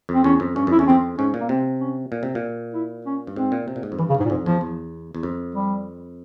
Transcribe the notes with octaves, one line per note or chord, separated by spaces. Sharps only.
F2
C4
E2 C#4
F2
G2 C#4
F2 E4
E2 C#4
F2 C4
G#2 C#4
A#2
A#3
C3 C4
C#4
A#2
C3
A#2
E4
C#4
G2
G#2 C4
A#2
C3
A#2
G#2
F2
G2 E3
C#3
G2
G#2
A#2
F2 G#2
E2 F3
E2
E2
F2
G3